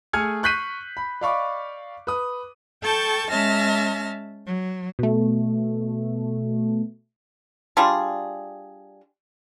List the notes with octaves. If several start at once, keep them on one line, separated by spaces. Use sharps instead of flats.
A3 G#4 G#5 F6 G#6 C#7
C#6 F#6 G6 B6 C7 D#7
B5
D5 D#5 F5 B5 C#6 D6
B4 D#6
A4 G5 A5 C#6 G6
G#3 C#4 E5 A5 F6 A#6
F#3
B2 A3
G3 D4 F4 G#4